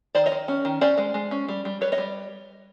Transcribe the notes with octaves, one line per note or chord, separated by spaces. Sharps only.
D#3 C5 D5
C#5 D#5
D#3
C#4
D#3
C#4 C5 D5
G#3
G#3
C#4
G3
G3
G3 B4 C#5
C#5 D#5
G3